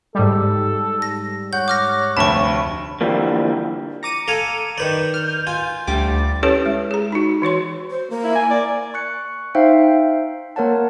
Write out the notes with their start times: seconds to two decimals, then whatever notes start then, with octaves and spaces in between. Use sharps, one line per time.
0.15 G#2 G3 A4
1.02 A#6
1.53 C#5 F#5 G6
1.68 D6 F6 A#6
2.17 F1 D2 A5 B5 C#6
3.01 D3 E3 F3 G3 A#3
4.03 A#5 D6 C#7 D#7
4.28 A4 F5 G#5
4.78 D#3 B4 D5 G6
5.14 F6
5.47 F4 G#5
5.87 D2 G3 D6 A6
6.43 C#4 E4 G4 A4 B4 C#5
6.66 G#3
6.91 G#4 A#5
7.12 D#4 F#4
7.42 E3 F#4 C#5 C6
7.90 C5
8.10 A#3
8.24 E4
8.35 G#5
8.51 D5
8.94 C#6 F#6 C#7
9.55 D#4 C5 E5 F5 G5
10.56 A#3 A#4 C#5 F#5 A5